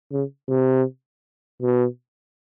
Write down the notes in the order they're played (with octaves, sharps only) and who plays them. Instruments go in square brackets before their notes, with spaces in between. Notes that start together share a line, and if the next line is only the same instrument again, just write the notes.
[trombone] C#3
C3
B2